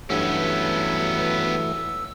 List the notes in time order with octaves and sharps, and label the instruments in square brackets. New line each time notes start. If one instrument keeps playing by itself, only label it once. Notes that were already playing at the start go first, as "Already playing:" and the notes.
[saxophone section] G2 F#3 [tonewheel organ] E3 A3 [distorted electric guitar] B3 C#4 [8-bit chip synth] E6